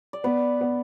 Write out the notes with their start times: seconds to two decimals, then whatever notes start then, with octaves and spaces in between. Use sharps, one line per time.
0.13 D5
0.24 B3 B4
0.61 B3